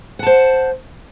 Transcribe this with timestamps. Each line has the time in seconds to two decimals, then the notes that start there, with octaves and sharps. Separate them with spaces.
0.19 F#5
0.23 A5
0.26 C5